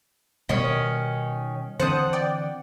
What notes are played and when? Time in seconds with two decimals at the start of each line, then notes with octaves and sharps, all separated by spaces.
0.49 B2 D#3 G3 B3 C#4
1.80 D3 E3 C4 C5 F#5 A5 D#6
2.13 D5 G5